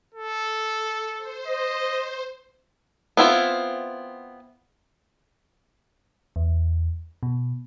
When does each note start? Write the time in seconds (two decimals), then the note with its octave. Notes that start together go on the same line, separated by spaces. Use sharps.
0.15 A4
1.17 C5
1.47 D#5
3.17 B3 C4 E4 F4
6.36 E2
7.23 B2